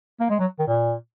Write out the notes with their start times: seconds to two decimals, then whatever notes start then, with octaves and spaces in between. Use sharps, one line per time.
0.20 A#3
0.30 G#3
0.39 F#3
0.59 D#3
0.67 A#2